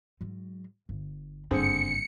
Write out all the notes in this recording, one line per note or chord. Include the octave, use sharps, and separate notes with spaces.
G#2 F#3
G1
F#1 G2 D3 C4 G#4 C#7